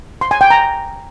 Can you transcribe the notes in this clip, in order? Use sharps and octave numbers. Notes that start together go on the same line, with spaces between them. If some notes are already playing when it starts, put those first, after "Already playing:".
C6
G#5
G5
A#5